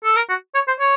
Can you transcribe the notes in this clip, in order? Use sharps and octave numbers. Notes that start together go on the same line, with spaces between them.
A4
A#4
F#4
C#5
C5
C#5